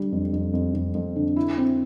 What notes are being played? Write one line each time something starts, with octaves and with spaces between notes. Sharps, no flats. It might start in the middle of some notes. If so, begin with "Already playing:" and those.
Already playing: D3 G3
F2
F2
F2
F2
F2
D3
E4
C4